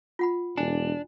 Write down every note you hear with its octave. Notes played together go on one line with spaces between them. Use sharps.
F4 F#5 B5
E1 D4 G#5